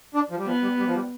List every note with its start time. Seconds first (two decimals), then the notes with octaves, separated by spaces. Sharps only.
0.14 D4
0.30 F3
0.38 G3
0.46 F3 B3
0.62 G3
0.78 G3
0.87 F3
0.94 G3